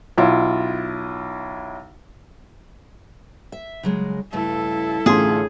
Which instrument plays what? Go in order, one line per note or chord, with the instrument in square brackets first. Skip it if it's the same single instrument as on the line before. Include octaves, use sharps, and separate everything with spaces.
[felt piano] B1 E4 F4
[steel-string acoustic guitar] E5
C#3 F#3 G#3
[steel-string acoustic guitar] G2 C#3 A3 [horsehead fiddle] E4 A4
[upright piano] A1 C6 [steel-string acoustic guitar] D3 F4 [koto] G#4